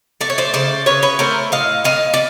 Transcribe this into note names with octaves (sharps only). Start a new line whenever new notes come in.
A3 D5
C#5
C5 D5
C#3 C5 D5
C#3 B4 C#5
B4 C#5
A3 A#4 C5
A2 D#5 F5
A2 D#5 F5
D5